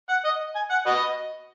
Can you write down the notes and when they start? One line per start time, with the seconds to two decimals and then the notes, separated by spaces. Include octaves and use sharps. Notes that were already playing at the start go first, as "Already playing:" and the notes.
0.09 F#5
0.25 D#5
0.55 G#5
0.70 F#5
0.86 F#4 B4 D#5